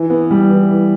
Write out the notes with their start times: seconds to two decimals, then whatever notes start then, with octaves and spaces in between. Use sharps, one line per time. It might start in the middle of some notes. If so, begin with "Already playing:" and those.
Already playing: E3
0.10 B3
0.31 G3
0.50 E3
0.70 E3